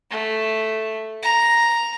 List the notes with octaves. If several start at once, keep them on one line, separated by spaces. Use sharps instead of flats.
A3
A#5